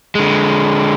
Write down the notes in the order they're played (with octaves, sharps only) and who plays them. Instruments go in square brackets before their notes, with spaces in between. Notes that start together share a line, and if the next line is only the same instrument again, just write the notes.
[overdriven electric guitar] D3 G#3